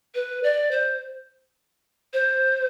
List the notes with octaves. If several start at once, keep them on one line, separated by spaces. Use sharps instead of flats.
B4
D5
C5
C5